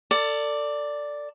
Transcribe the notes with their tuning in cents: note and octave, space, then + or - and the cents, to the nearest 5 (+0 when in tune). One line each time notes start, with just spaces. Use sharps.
A4 +35 D5 +0